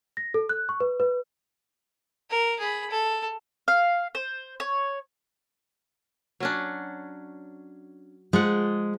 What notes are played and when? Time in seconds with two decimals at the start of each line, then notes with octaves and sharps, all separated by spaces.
0.17 A#6
0.34 A4
0.49 F#6
0.69 C#6
0.80 B4
1.00 B4
2.30 A#4
2.59 G#4 B5
2.90 A4
3.68 F5
4.15 C5
4.60 C#5
6.40 F#3 C#4 D4
8.33 F3 G#3 F#5